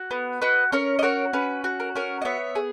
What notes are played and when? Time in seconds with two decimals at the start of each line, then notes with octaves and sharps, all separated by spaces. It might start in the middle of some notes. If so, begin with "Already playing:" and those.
Already playing: F#4
0.11 B3
0.42 F#4 B4 D#5
0.72 C#4 A#4 C#5
0.99 D#5
1.02 F#4 A#4 C#5
1.33 C#4 B4
1.64 F#4
1.80 A#4
1.95 C#4 A#4
2.22 D#5
2.25 B3 C#5 E5
2.55 G#4